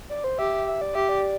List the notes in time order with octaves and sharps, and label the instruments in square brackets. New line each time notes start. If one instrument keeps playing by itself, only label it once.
[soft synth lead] D5
C5
[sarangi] G4 [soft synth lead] E5
[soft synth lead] E5
D5
[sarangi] G4 [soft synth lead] E5
[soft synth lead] D5